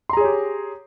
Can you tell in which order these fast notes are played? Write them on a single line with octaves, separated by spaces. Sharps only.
C6 A#5 G#4 C#5 G4